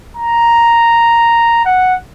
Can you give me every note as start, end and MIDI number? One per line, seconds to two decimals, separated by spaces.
0.17 1.62 82
1.66 1.94 78